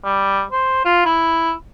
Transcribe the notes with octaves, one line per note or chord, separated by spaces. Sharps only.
G3
C5
F4
E4